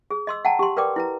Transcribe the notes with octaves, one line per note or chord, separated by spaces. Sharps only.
G#4
D#5 C6 E6
F#5 G5 A5 A#5
G4 C6
A#4 B4 D5 G5 D6
E4 B4 A#5